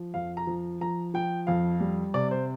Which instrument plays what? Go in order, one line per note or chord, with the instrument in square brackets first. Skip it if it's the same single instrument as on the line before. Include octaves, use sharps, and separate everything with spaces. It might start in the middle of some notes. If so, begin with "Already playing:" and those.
Already playing: [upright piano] F3
F2 F5
A#5
F3
F3 A#5
F3 G5
F2 F5
G3
C3 D5
C5